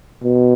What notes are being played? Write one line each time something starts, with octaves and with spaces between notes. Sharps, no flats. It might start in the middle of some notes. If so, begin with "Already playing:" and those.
B2